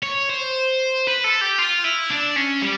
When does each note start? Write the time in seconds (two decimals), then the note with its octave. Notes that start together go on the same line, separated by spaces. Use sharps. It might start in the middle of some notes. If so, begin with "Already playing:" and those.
0.03 C#5
0.29 C5
1.07 B4
1.24 A4
1.41 G4
1.59 F4
1.85 E4
2.10 D4
2.36 C#4
2.62 G3